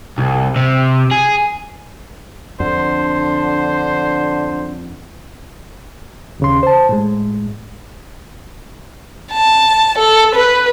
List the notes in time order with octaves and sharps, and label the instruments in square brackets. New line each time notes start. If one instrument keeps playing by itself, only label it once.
[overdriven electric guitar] C2
C3
G#4
[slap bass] F2 [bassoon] D3 [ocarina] D4 [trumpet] C5
[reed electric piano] D#2 C#3 C6
C5 A5
A2 G#3
[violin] A5
A4
B4